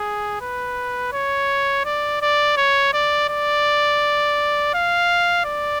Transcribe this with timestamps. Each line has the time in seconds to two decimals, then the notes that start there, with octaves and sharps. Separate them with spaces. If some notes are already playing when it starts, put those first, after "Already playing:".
Already playing: G#4
0.41 B4
1.13 C#5
1.85 D5
2.22 D5
2.57 C#5
2.93 D5
3.29 D5
4.74 F5
5.45 D5